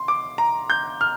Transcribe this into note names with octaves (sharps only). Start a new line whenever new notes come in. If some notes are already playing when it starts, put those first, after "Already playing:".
Already playing: C6
D6
A#5
G6
F6